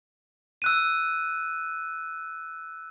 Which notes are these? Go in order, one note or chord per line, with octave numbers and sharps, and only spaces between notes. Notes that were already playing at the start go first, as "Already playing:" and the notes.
E6 F#6 D#7